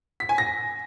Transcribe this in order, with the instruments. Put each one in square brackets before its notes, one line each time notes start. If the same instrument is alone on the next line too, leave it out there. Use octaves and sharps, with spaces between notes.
[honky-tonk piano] B6
G#5
A#6